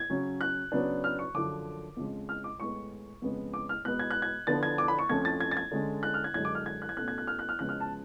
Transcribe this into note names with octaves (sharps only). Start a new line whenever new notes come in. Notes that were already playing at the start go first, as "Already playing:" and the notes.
Already playing: G#6
C#3 F#3 C#4
F#6
C#3 F#3 B3 D4
F6
C#6
F#2 D3 F3 D6
F2 C#3 F3 G#3
F6
D6
A2 G#3 B3 C#6
F2 C#3 G#3 B3
D6
F6
B2 G#3 B3 F#6
G#6
F#6
G#6
D3 F3 B3 D4 A6
G#6
D6
B5
C#6
F2 F3 A3 C#4 G#6
A6
G#6
A6
G#6
D3 G#3 C#4
F#6
F6
G#6
F#2 D3 G#3 G#6
D6
F6
G#6
F#6
G#6
B2 A3 C#4 F#6
G#6
F#6
F6
F#6
F6
C#3 F3 G#3 B3 F#6
F6
A5